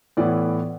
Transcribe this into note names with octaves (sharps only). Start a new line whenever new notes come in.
A2 E3 B3 D5